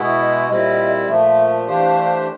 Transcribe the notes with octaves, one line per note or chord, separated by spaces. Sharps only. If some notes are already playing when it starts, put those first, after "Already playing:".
Already playing: B2 G#3 B3 E4
D#5
A#2 G3 C4 E4 D#5
A#2 F3 A3 E5
E3 A3 D4 G4 C5 F5